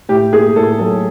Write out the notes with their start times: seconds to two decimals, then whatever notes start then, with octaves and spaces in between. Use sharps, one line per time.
0.09 A2 G4
0.32 A#3 G#4
0.56 A2 A4
0.79 F#3 A4